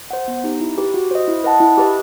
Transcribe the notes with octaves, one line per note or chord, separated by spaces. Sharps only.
C5 F#5
B3
D#4 G4
E4
G4 B4
F#4
C5 D#5
E4
B4 D#5 F#5 A5
E4
G4 B4 D#5